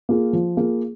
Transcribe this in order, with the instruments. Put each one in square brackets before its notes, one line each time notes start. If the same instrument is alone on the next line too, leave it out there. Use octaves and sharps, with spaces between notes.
[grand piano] A#3 F4 G#4
F3
A#3 F4 G#4